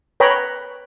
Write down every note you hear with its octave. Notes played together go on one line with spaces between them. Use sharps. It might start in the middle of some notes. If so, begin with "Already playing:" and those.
B4 C#5 G5 A#5 B5